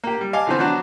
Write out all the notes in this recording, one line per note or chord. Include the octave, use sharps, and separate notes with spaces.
A#3 G4
G3
D#5 F5 G#5 A5 D6
D3 E3 F3 B3 C4
F#3 B3 D4 F#4